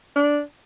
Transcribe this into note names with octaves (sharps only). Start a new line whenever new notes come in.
D4